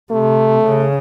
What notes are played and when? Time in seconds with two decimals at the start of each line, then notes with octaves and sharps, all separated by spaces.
0.11 C3 A3
0.65 C#3